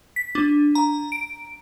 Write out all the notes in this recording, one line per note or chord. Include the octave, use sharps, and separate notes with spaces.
B6
D4
A#5
D7